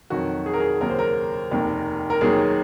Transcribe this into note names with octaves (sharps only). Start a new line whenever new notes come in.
F2 D#3 F#3 F#4
G#4
A#4
G#4
D#2 C#3 F#3 A#4
C5
A#4
F1 D#2 D#3
A#4
D#2 D#3 F#3 G#4